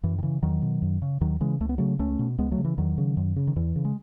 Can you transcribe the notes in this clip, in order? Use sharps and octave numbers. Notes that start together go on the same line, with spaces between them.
F#2 E3
D#3
C#3 E3
E2 D#3 F#3
B2
F#2
C#3
D#2 D#3 F#3
C#3 E3 G#3
C#2 A3
B3
C#3 F#3 A3
C#2 A3 C#4
B2
C#2 G#3 B3
F#3 A3
C#3
E3
E2 D#3 F#3
C#3
F#2
C#3
D#3
E2 E3
C#3
G#3